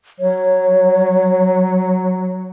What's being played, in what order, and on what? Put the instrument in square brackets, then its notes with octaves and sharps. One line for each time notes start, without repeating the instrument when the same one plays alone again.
[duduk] F#3 [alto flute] C#5